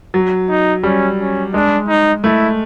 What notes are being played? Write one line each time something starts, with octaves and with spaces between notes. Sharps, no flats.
F#3
D#4
G3 C#4
C#4
G#3 D4
D#4
A3 E4